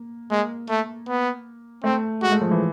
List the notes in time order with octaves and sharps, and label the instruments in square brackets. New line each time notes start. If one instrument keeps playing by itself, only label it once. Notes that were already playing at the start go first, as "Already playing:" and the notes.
Already playing: [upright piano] A#3
[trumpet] G#3 [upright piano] A#3
[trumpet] A3
B3
[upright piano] A3 [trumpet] C4
[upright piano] G#3 [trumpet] F#4
[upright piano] A3
F3
E3